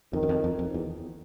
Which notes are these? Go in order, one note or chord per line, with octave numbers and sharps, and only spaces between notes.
F2 D#3
F#2
F2
F2
F2
E2